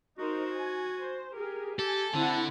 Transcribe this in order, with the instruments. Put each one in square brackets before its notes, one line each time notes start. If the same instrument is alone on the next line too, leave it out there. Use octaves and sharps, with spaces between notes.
[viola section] D#4 A#4 C5 [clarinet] F#4
[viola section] G#5
C5
G4 G#4 A#4
[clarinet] G4 [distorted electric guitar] A4 [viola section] G#5
[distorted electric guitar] D3 [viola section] C4 E4 F#5 [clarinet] A5